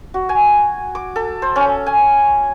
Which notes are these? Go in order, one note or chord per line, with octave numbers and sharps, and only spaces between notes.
F#4
G#5
D6
A4
C5
C#4
G#5